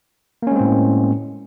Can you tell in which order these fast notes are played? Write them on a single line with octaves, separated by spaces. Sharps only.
A#3 C#4 G#3 C4 A2